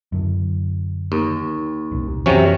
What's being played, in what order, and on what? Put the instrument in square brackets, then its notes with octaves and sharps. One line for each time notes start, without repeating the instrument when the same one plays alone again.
[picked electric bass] F#2 D3
[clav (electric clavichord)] D#2
[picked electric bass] D#1 C2
[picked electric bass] F#2 E3 [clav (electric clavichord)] C3 F#3 C#4